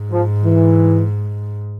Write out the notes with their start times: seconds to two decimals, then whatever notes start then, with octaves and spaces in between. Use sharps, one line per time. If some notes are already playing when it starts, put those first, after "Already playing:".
Already playing: G#2
0.12 F3
0.44 E3